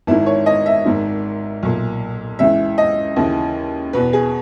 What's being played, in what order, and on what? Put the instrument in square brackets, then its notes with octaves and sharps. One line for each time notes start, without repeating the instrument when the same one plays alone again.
[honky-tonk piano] G#1 G#2 D#3 E4
C#5
D#5
E5
G#1 G#2 D#3
B1 A#2
C#2 C#3 E3 E5
D#5
D#2 C#3 E3
E2 B2 B4
G#4